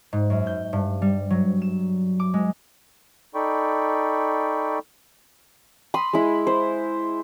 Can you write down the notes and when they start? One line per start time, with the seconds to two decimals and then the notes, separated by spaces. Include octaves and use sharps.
0.13 G#2
0.30 F#2
0.47 G6
0.73 G2
1.02 G3
1.30 F#3
1.62 E7
2.20 D6
2.34 G#3
3.35 D#4 A4 D5 G5 B5 C#6
5.94 B5 C6 D#6
6.13 G#3 E4
6.47 C5